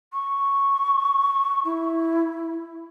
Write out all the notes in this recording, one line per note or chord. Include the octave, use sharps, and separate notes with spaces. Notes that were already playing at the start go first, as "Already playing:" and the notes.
C#6
E4